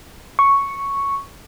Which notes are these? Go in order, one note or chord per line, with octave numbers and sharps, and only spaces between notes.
C#6